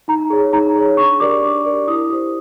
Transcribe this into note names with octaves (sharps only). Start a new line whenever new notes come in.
D#4 A#5
G#4 C#5
D#4 A#5
G#4 C#5
D4 C#6
G4 A#4 D5 D6
D4
G4 A#4 D5
E4 D#6
G4 C5